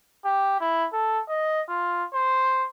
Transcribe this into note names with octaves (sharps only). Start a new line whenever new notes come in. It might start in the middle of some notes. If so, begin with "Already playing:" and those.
G4
E4
A4
D#5
F4
C5